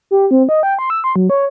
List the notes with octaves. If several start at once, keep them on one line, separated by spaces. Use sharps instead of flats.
G4
C4
D#5
G5
C6
E6
C6
F#3
C#5